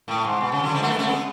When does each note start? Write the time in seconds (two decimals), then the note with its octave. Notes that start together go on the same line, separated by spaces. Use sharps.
0.08 A2
0.25 G#2
0.41 B2
0.52 C#3
0.63 D3 F#3
0.74 F3 G#3
0.83 F#3 A3
0.90 G#3 B3
0.99 A3 C#4
1.07 G#3 B3